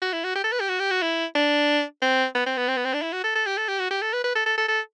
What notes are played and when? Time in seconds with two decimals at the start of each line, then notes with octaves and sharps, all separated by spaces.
0.02 F#4
0.13 E4
0.24 F#4
0.35 G4
0.44 A4
0.52 B4
0.60 G4
0.68 F#4
0.80 G4
0.91 F#4
1.02 E4
1.35 D4
2.02 C4
2.35 B3
2.46 C4
2.57 B3
2.68 C4
2.77 B3
2.85 C4
2.94 D4
3.02 E4
3.13 F#4
3.24 A4
3.35 A4
3.46 G4
3.58 A4
3.68 G4
3.79 F#4
3.91 G4
4.02 A4
4.13 B4
4.24 B4
4.35 A4
4.46 A4
4.57 A4
4.68 A4